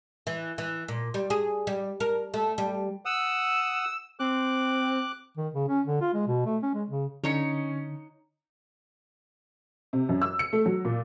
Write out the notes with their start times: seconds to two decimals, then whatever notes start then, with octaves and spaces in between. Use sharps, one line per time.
0.27 E3
0.58 E3
0.88 A#2
1.14 G3
1.30 G#4
1.67 G3
2.00 A#4
2.34 A3
2.58 G3
3.05 F#5 D#6 E6
4.20 C4 D6 F#6
5.37 D#3
5.54 C#3
5.68 C#4
5.87 D3
6.01 F4
6.14 G#3
6.27 B2
6.45 A3
6.63 C#4
6.74 G#3
6.89 C#3
7.24 D3 C#4 D#4 C#5 C#7
9.93 C3
10.09 F#2
10.22 E6
10.39 C#7
10.53 A3
10.66 F#3
10.85 A#2